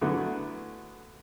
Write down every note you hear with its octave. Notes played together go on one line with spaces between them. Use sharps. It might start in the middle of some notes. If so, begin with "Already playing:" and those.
D3 F#3 A3 B3 E4 G#4